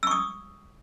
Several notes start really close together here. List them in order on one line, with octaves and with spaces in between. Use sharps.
E6 C#6 D#6